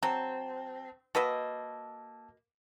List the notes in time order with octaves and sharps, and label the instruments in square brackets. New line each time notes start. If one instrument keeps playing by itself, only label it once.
[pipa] F#3 [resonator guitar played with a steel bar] C4 [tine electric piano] A5
[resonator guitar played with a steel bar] A#3 [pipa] F#4 B4 D#5 [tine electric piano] A5 E6